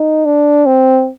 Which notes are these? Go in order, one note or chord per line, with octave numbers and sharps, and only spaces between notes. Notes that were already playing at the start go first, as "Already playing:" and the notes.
Already playing: D#4
D4
C4